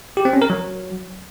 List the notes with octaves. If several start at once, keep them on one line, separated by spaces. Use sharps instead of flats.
G4
C4
C#4
A#4
F#3